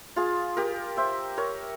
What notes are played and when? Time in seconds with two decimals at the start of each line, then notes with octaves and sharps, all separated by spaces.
0.16 F4 G#4
0.57 G4 A#4
0.97 C5 E5
1.37 A#4 C#5